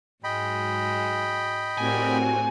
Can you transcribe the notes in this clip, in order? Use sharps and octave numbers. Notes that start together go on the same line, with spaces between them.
G#2 F#3 G#3 D#5 G5 B5
A2 C4 F#4 G4 A#4 D5 G#5